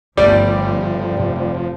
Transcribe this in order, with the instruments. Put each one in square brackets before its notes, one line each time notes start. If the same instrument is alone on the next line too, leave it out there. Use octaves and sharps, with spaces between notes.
[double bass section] G1 C#3 [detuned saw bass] F3 [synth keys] G3 A3 [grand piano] D5
[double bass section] F1